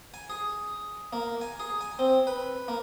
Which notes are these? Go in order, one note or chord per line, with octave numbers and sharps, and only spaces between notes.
G#5
G#4
A#3
G#5
G#4
G#5
C4
B4
A#3